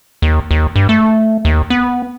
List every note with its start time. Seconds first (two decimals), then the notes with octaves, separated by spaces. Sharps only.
0.22 D#2
0.51 D#2
0.76 G2
0.89 A3
1.45 D#2
1.70 B3